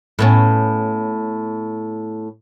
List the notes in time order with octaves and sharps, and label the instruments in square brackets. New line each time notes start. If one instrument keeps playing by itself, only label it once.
[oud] A2 B3 C#4